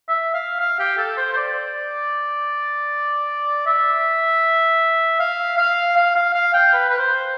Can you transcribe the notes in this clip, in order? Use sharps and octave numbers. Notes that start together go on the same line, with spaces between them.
E5
F5
F5
G4
A4
C5
C5
D5
E5
F5
F5
F5
F5
F5
G5
B4
B4
C5